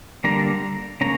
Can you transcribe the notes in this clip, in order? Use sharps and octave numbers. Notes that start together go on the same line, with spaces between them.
D3 G3 A#3 A#5
C#3 A#3 C#4 A#5